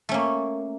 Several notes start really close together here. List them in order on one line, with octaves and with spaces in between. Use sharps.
A3 C#4 A#3